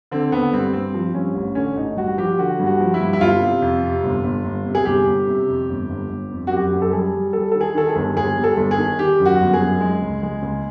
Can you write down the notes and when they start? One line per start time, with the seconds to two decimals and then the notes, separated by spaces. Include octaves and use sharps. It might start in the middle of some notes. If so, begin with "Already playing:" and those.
0.11 D3 C4
0.32 D3 B3
0.53 G2 C4
0.73 G2 C4
0.94 F3
1.14 G2 C#4
1.35 A1
1.55 D3 C#4
1.77 A1 D#4
1.97 G2 F#4
2.18 F3 G4
2.38 D3 F#4
2.59 G2
2.66 F#4
2.80 F3
2.94 E4
3.00 G2
3.13 E4
3.20 G1 F4
3.41 C3
3.62 F2
3.83 C3
4.04 G1
4.23 G1
4.44 G1
4.66 C3
4.75 G#4
4.85 G1 G4
5.07 G1
5.27 C3
5.48 F2
5.69 G1
5.90 G1
6.09 G1
6.31 F2
6.47 F#4
6.50 F#2 G4
6.72 F#2
6.82 A4
6.92 G3 G#4
7.13 G3
7.33 G3 A4
7.52 D#3 A4
7.61 G#4
7.75 D#3 A4
7.89 G#4
7.96 G1
8.16 G1 G#4
8.37 G3
8.44 A4
8.57 G1
8.71 G#4
8.78 D#3
8.99 D#3 G4
9.20 F#2
9.26 F#4
9.40 G1
9.53 G#4
9.60 F#2
9.81 G#3
10.02 C#2
10.23 G#3
10.42 C#2